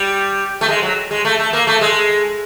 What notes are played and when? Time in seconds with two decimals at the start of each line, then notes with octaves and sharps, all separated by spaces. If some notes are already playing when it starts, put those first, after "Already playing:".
Already playing: G3
0.61 A3
0.68 G#3
0.82 F#3
1.11 G#3
1.25 A3
1.39 A3
1.53 A#3
1.67 A3
1.81 G#3